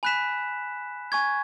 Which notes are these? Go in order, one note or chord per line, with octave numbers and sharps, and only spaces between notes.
G#5 B5 F#6 B6 E7
G#5 C#6 G#6